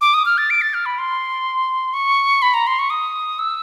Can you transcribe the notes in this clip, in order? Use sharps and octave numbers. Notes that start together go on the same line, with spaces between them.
D6
D#6
F6
A6
D7
A6
F6
B5
C6
C#6
B5
A#5
C6
C#6
D#6
E6